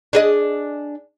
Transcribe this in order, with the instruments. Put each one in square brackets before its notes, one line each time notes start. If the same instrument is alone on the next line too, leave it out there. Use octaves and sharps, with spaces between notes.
[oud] D4 G#4 D#5